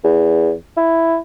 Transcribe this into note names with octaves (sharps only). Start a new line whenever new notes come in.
E2
E4